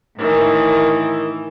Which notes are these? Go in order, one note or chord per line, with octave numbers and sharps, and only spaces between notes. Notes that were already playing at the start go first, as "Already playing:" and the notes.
A2 D#3 E3